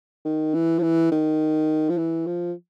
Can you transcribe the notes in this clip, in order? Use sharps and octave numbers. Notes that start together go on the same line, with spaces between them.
D#3
E3
F3
E3
D#3
F3
E3
F3